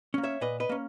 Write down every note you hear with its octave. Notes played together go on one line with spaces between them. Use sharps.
A#3 C#4
C#5 E5
A#2 B4 D#5
B4 D#5
A#3 C#4